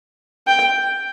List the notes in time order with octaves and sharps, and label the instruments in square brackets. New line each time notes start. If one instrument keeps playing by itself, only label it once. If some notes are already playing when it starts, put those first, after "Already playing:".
[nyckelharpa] G5